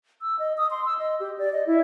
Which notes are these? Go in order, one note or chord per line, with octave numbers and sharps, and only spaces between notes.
E6
D#5
D#6
C6
E6
D#5
G4
D5
D#5
E4